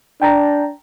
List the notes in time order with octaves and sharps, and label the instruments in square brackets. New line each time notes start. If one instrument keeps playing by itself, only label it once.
[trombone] D4 [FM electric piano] G5 A5 A#5